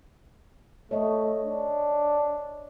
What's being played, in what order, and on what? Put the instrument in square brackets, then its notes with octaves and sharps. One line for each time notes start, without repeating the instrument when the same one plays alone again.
[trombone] A3 [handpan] C#5 D#5
[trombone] D4